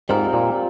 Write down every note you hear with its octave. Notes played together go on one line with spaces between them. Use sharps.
G#2 G3 C4 F4 A#4
A#2